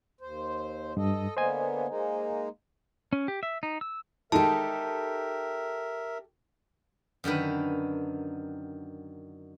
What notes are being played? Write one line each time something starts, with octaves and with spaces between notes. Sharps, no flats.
D#2 C5
G2 A4 D#5
D3 A#3 B3 C5 D#5 G#5
G#3 A#3 D#4
C#4
G4
E5
D#4
E6
D#3 G#3 D#4 G4 A4 A#4 E5 A5
F#2 D3 D#3 B4